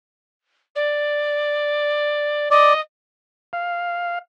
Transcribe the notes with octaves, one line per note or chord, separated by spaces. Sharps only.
D5
D5 D#5
F5